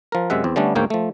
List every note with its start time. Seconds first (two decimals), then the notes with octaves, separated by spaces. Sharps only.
0.12 F3 A#4
0.30 F#2 C3 G#3 E5 F#5
0.44 E2 C4
0.56 D3 G3 A3 B3 C#4 D4
0.75 D2 G#2 A#3 C#5 G5
0.90 F3 A3